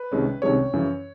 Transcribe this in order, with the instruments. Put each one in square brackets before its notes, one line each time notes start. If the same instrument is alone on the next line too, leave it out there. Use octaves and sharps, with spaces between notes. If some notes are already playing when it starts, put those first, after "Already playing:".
Already playing: [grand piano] B4
C2 C3 D#3 G#3 C#4
C2 C3 D#3 G#3 C#4 C#5
F#2 C#3 E3